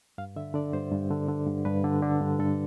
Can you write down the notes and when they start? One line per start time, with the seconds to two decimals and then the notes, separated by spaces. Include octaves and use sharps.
0.18 G2 F5
0.36 D3 E5
0.54 D3 D5
0.73 G2 C5
0.92 G2
1.11 D3
1.28 D3
1.47 G2
1.65 G2 B4
1.84 D3
2.02 D3
2.21 G2
2.39 G2 A4